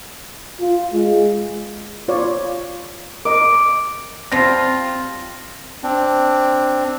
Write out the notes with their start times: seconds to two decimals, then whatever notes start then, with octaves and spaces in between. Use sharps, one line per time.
0.60 F4
0.94 G#3
2.08 F4 C#5 D5
3.25 A#4 D#5 D6
4.32 F3 G3 C4 F4 A#6
5.83 C4 D4